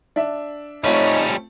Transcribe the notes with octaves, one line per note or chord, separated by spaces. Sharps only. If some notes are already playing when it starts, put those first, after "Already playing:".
D4 E5
G3 A3 C4 C#4 D#4 F4 C#5